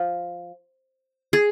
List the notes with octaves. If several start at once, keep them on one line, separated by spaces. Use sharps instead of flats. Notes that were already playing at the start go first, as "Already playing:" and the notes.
Already playing: F3
G#4